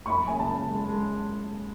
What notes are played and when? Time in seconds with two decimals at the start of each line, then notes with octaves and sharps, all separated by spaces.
0.06 C#6
0.10 F#2 B5
0.27 C#3 G#5
0.39 A5
0.49 C#3
0.69 G#3
0.88 G#3